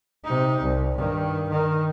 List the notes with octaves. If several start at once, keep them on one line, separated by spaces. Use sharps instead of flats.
C3 D#4
C2
G2 D#3
D#3